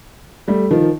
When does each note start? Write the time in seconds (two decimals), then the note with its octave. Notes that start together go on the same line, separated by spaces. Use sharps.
0.48 G3 A3
0.71 D#3 F3